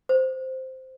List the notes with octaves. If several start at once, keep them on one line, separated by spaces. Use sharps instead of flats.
C5